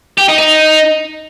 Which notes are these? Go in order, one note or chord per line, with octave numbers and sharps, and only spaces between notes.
G4
D#4
D#4